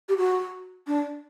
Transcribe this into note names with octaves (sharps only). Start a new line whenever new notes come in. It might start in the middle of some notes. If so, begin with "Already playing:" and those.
G4
F#4
D4